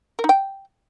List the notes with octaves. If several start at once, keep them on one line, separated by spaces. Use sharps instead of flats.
A#4
D#4
G5